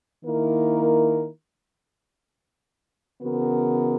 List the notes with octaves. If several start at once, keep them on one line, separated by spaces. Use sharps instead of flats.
D#3 A#3 E4 A#4
C#3 E3 B3 F#4 A#4